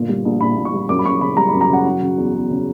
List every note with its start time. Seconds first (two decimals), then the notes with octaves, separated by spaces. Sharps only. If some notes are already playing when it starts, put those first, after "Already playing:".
Already playing: G1 A#2
0.09 G3
0.25 A#1
0.41 A#1 B5
0.57 A#1
0.65 C#6
0.74 G3
0.89 F#2 D6
0.99 B5
1.05 F#2 C#6
1.21 C#3 B5
1.37 G3 A#5
1.49 B5
1.53 F#2
1.61 A#5
1.69 C#3 F#5
1.85 F#3
2.02 C#3
2.18 E2
2.34 E2
2.50 C#3